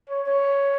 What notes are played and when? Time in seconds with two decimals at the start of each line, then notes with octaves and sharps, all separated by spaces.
0.10 C#5
0.27 C#5